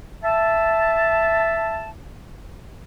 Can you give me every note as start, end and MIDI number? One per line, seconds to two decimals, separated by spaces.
0.24 1.89 76
0.24 1.89 81